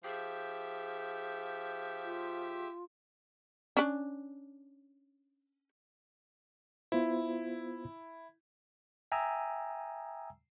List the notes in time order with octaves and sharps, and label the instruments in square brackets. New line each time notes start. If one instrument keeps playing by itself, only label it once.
[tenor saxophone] F3 [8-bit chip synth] G4 E5 [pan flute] G#4
[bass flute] F4
[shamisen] C#4 D4
[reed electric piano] B3 F4 C5 [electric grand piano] E4
[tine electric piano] E5 G5 G#5 A#5 D#6 E6